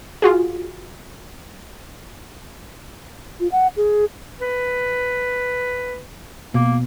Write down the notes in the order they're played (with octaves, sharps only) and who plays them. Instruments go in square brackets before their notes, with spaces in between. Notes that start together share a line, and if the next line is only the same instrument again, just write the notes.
[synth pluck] F4 F#4 G#4
[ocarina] F4
F#5
G#4
[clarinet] B4
[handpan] B2 [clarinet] A#3